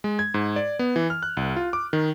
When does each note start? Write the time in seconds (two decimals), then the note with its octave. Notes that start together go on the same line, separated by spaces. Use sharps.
0.04 G#3
0.19 G#6
0.34 G#2
0.56 D5
0.79 B3
0.96 E3
1.10 F6
1.23 F#6
1.37 C2
1.56 F4
1.73 D6
1.93 D#3